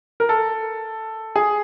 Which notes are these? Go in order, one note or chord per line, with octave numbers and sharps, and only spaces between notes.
A#4
A4
G#4